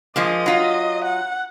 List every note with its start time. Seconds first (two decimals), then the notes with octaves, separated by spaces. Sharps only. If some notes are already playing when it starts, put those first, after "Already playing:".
0.16 F3 G#3 A#3 D#5
0.46 F#3 F4
1.05 F#5